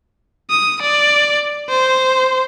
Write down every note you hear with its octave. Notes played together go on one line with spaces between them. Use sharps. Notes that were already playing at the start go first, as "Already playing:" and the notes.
D#6
D5
C5